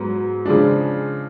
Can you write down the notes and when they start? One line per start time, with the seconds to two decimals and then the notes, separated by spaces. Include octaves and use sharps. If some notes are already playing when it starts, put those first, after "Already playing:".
Already playing: G#2 F#3 B3
0.46 C#3 F3 G#3 D4